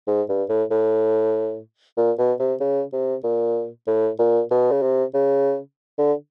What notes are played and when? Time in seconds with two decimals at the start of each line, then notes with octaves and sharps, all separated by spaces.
0.07 G#2
0.29 G2
0.49 A2
0.71 A2
1.97 A#2
2.18 B2
2.39 C3
2.60 C#3
2.93 C3
3.24 A#2
3.87 A2
4.19 A#2
4.51 B2
4.71 C#3
4.82 C3
5.14 C#3
5.98 D3